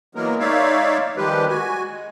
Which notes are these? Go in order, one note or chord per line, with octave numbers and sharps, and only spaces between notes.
E3 F#3 G#3 A#3 B3 A#4
G#3 D#4 C#5 D5 E5 F5
D#3 F3 G3 G#3 G4 B4
F#4 G#5
G#3